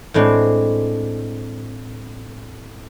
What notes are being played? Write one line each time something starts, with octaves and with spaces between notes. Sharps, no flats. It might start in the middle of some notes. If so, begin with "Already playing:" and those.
A2 G#3 C4 D4